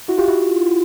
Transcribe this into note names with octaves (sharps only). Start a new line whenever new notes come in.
E4 F#4
F4 G4
E4 F#4